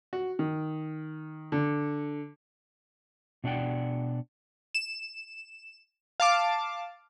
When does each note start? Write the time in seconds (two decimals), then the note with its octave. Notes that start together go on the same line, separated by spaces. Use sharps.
0.13 F#4
0.39 D#3
1.52 D3
3.44 B2 D4 D5 F#5 G5
4.75 E7
6.20 F5 A5 D6